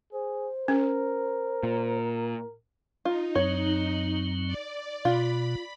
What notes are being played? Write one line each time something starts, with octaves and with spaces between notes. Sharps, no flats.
G#4 C5
C#4 A#4
A#2
D#4 F4
F#2 F#3 C4 C#5
D5
B2 F4 B5